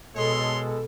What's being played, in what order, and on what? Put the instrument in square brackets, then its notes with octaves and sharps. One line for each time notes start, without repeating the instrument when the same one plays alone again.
[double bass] B2 [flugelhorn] G#3 [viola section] A4 [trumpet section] C#5 D#5 C6